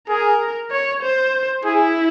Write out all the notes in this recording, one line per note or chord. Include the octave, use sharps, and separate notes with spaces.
G#4 A#4
C#5
C5
E4 G#4